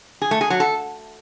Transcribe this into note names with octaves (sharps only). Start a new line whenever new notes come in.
G#4
A3
G#4
F#3
A4